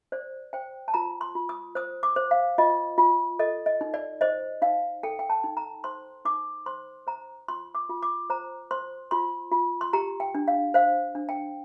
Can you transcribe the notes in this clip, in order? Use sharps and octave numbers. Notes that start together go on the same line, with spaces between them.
C5 D5
C5 G5
A5
F4 A#5
C6
F4
D#6
C5 D#6
D6
C5
F5
F4 D#5
F4
A4 D#5
D#5
D#4
D5
C5 D#5
D#4 F5
A4 G5
G5
A5
D#4
A#5
C5 C6
D#4 D6
C5 C6
C5 A#5
F4 C6
D6
F4
D6
C5 A#5
C5 C6
F4 C6
F4
C6
G4 A#5
G5
D4
F5
C5 F5
D4
G5